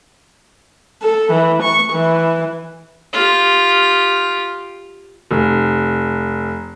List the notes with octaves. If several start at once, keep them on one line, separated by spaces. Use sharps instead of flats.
A4
E3
C#6
E3
F4 G4
F1